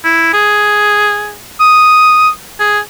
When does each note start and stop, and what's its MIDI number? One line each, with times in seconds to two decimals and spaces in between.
0.04 0.32 64
0.33 1.35 68
1.60 2.28 87
2.60 2.79 68